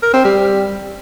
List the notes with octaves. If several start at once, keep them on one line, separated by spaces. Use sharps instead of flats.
A#4
C4
G3